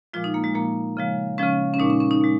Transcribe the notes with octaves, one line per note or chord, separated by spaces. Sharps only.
A#2 F3 G#3 F4
D#4
A#3
G#3
A#2 F3 G#3 A#3
C#3 F3 G#3
C#3 F3 G#3 C#4
C#4
A#2 G#3 D#4
C#4
C#4
D#4
A#2 G#3